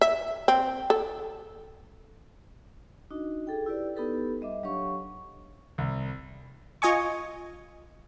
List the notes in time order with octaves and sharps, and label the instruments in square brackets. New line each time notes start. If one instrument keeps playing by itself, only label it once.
[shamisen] E5
C4
A4
[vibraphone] D4 D#4 F#4 D#5
G#4 A4 G5
E4 G4 B4 D5
B3 D#4 G4 A4 B4
G3 D#5 E5 D6
F#3 D4 G4 C#5 F5 C#6
[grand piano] C2
[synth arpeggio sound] F4 D#5 G#5 C#6